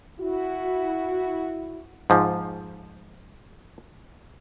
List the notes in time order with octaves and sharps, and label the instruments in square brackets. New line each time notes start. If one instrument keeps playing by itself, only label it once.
[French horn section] E4 F#4
[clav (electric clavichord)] G#2 F3